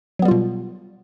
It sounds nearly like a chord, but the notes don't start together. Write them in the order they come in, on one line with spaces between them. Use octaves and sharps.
F#3 B3 G3 F4 B2